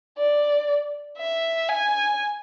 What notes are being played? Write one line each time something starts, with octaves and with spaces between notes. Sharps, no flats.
D5
E5
G#5